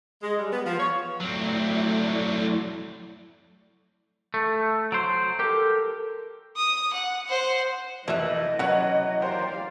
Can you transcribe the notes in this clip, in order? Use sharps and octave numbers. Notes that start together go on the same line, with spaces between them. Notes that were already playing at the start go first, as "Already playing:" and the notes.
G#3
G3
B3
F3
C#5
F#3 A3 C4 E4 D5
A3 A4
F#3 C5 D7
G4 A4 A#4
D#6
F#5
C5 F#5
F2 E3 A#4 D#5 E5 F#5
E3 F#3 C#4 B4 F#5 C#7 F#7
G4 A#4 C5 D5 F5